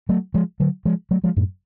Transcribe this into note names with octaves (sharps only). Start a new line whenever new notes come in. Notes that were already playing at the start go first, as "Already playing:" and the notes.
F#3 A3
F3 G#3
D3 F#3
F3 G#3
F#3 A3
F3 G#3
F#2 A2